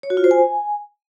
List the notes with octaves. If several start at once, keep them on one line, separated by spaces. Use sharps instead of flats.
C#5
F#4
F4
C5
G#5